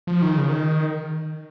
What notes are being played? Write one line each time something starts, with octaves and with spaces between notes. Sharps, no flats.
F3
D#3
C#3
D#3